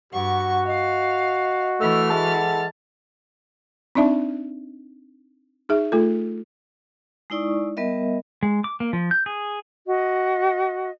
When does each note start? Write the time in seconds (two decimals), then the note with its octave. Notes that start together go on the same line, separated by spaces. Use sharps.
0.13 G2 F#4 F#5 C#6
0.67 D#5 F5
1.80 E3 A3 F6
2.10 G#3 A4 F#5 A5
3.95 C4 D4 D#4 D5 E5 A5
5.69 D#4 G#4 E5
5.92 A3 F4 A4
7.30 G#3 D#4 E4 D5 C#6 D#6
7.77 G3 B3 A#4 D#5 E5
8.43 G#3
8.64 D6
8.80 A#3
8.93 F3
9.11 G6
9.26 G#4
9.87 F#4 D#5